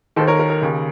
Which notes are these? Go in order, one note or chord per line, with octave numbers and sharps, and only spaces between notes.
D#2 D#3 A4 C5
A#4 C#5
A#4
A#4
D#2 C#3